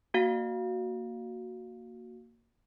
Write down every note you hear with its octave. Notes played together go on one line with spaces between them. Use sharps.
A#3 F#4 F5